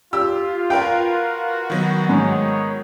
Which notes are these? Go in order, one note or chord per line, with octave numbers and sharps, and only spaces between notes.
F4 G4 E6
F#4 A#4 B4 F5 G5
D#3 F#3 B3
G#2 D#4 C#5